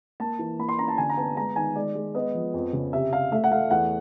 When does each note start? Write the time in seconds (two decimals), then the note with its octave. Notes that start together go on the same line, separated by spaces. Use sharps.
0.20 A#3 A5
0.39 E3
0.59 A#3 B5
0.69 C6
0.78 C#4 A#5
0.88 A5
0.98 D3 G#5
1.09 A#5
1.17 B3 A5
1.37 G#3 A#5
1.56 D#3 G#5
1.75 G#3 D5
1.95 G#3
2.15 B3 D#5
2.34 F3
2.54 F2
2.73 C#3
2.93 C3 E5
3.12 C3 F5
3.32 A3 E5
3.44 F#5
3.51 A3 F5
3.71 E2 F#5